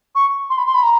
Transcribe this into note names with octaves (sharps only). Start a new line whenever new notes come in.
C#6
C6
B5
C6
B5
A#5